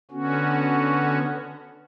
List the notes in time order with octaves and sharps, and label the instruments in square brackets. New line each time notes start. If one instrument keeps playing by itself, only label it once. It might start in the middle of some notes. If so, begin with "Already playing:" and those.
[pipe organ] D3 B3 C#4 F#4